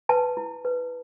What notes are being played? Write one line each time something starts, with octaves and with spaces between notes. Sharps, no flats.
B4 A5
E4
B4